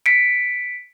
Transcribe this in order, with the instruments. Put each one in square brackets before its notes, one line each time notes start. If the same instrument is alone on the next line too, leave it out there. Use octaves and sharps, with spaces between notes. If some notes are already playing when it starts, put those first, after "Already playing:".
[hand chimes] B6 C#7 D7